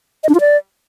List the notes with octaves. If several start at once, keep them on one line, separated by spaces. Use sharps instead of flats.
D#5
D4
F4
D5